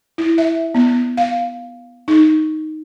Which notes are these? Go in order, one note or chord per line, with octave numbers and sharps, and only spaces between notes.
E4
E5
B3
F5
D#4